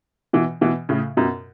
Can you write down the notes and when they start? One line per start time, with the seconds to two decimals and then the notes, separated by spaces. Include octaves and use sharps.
0.33 B2 E3
0.61 B2 E3
0.89 A2 C#3
1.17 F#2 B2